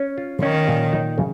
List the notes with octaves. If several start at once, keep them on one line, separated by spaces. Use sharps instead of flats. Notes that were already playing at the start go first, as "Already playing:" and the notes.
Already playing: C#4
F4
D#3 C#4
A#2
D#4
C#3